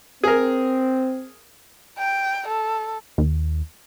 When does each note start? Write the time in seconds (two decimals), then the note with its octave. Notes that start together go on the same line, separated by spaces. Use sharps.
0.24 C4 G#4 A#4
1.98 G5
2.48 A4
3.18 D#2